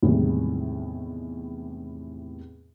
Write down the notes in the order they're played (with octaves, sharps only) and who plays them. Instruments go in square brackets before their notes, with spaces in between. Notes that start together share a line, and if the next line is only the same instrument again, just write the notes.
[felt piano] E2 A2 C3 D#3 G3 G#3